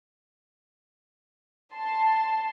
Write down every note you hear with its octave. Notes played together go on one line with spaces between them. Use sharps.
A5 C6